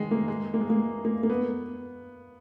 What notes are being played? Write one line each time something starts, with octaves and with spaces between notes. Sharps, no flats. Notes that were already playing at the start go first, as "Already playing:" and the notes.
Already playing: D#3 G#3
A#3
G#3
A#3
G#3
A#3
A#3
A#3
B3